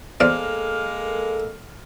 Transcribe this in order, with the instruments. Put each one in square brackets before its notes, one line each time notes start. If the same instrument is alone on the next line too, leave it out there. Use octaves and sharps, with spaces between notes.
[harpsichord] E2 C5 D5 [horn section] G#3 A#3 [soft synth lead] A4 [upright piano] F6